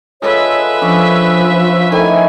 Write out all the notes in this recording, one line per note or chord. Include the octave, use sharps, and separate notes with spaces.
G#3 F4 A4 B4 C#5 E5
F3 C#4 D4 G#4
D#3 E3 A3 G#5